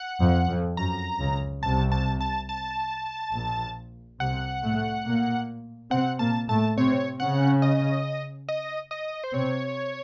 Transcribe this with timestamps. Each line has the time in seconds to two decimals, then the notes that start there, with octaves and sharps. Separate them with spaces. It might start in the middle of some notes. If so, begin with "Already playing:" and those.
Already playing: F#5
0.21 F2
0.49 F2
0.77 F#2 A#5
1.20 C#2 C#3
1.63 C2 C3 A5
1.92 A5
2.20 A5
2.49 A5
3.34 A#1 A#2
4.20 C2 C3 F#5
4.63 A2 A3
5.06 A#2 A#3
5.91 C3 C4 F#5
6.19 A#2 A#3 A5
6.48 A2 A3 A5
6.77 C3 C4 C#5
7.19 C#3 C#4 F#5
7.62 D#5
8.49 D#5
8.91 D#5
9.24 C5
9.33 C3 C4 C#5